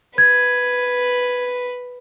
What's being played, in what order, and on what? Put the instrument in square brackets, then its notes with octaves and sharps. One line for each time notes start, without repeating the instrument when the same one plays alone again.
[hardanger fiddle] B4 [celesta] G#6